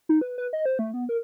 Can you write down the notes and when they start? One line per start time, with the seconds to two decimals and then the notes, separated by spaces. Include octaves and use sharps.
0.09 D#4
0.21 B4
0.38 B4
0.53 D#5
0.66 C5
0.79 A3
0.93 B3
1.09 A#4